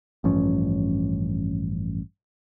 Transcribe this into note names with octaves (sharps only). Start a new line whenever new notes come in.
A1 G2 F3 C#4